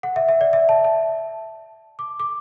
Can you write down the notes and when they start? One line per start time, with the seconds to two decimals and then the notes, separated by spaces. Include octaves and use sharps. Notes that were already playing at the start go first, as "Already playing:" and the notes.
0.03 F#5
0.16 E5
0.29 E5
0.41 D5
0.53 E5
0.69 A5
0.84 A5
1.99 D6
2.20 D6